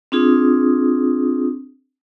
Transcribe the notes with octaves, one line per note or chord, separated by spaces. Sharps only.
C4 D4 F4 G#4 D#6